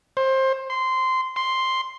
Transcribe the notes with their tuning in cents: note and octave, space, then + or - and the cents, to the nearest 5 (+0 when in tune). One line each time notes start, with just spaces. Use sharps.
C5 +20
C6 -15
C6 +0